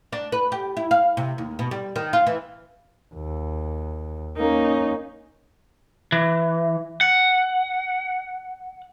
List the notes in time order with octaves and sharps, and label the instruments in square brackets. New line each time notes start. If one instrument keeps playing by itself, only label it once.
[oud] D4
B4
G4
E4
F5
C3
D#2
B2
G3
D#3
F4
E3
[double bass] D#2
[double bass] A#3 C#4 [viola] D#4
[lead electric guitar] E3
F#5